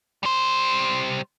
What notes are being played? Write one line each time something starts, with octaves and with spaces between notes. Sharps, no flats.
G3 C5